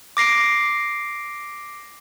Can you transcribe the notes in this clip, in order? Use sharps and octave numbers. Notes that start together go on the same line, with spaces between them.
D6 A#6 C7 D7